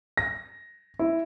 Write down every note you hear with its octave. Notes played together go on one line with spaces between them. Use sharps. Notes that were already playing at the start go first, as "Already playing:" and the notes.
A#6
E4